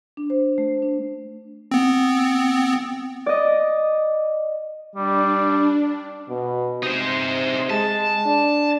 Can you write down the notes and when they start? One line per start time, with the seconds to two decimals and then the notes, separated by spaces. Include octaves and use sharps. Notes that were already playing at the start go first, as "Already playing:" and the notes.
0.17 D4
0.30 C5
0.58 A3
0.82 D4
1.71 B3 C4
3.26 D5 D#5
4.95 G3 D4
6.29 B2
6.83 C3 D#4 C5
7.70 G#3 A5
8.26 D4